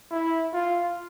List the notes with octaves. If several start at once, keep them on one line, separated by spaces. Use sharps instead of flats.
E4
F4